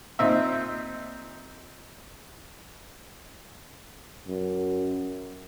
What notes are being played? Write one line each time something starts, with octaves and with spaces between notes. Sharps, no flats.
A#2 C4 D#4 E5
F#2